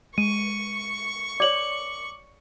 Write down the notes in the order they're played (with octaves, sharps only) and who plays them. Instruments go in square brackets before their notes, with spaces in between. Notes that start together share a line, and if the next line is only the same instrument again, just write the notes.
[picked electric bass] G#3 [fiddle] C#6 [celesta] D#7
[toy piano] C#5 D5 [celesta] D6 F#7